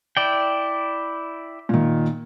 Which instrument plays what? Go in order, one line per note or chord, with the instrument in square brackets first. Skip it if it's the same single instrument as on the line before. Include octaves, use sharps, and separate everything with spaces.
[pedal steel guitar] E4 D5 G5
[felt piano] A#2 D#3